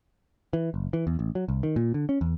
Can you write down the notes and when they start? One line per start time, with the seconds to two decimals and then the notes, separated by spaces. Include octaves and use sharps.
0.53 E3
0.74 F#1
0.93 E3
1.07 E2
1.19 A1
1.35 F#3
1.48 C2
1.63 D#3
1.76 A#2
1.94 D3
2.09 C#4
2.21 E2